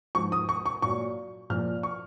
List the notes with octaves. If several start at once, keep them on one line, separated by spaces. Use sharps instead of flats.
G#2 F3 C#6
D#6
C#6
C#6
A#2 F#3 C#6
A#2 F3 F6
C#6